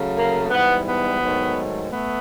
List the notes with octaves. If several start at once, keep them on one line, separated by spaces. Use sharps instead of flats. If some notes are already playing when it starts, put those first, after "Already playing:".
Already playing: C#3 F#3 A3
A#3
G#2 E3 G3 B3
B3
G#2 D#3 F#3 A3
A3 B3